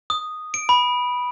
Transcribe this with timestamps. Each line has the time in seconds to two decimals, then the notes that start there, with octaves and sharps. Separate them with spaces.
0.10 D#6
0.54 D7
0.69 B5